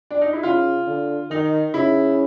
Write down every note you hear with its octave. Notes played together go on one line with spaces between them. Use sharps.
D4
D#4
E4
C#3 F4
D3
D#3 D#4
C#3 E4